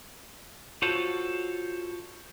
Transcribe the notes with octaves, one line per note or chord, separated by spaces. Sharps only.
F4 F#4 A4 C5 C#5